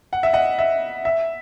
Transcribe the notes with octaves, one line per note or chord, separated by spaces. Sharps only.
F#5
E5
D#5 F#5
E5
E5